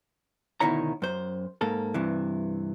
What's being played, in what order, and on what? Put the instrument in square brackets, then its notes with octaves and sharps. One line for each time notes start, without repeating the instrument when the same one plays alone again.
[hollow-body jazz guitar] D2 B2 D#3 E4 C#5 A#5
F#2 C5
G#2 A#3 A4
G2 C3 E3